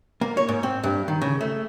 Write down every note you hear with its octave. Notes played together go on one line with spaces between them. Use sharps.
A#3
C#5
G#2
C4
G2
D#3
C#3
A3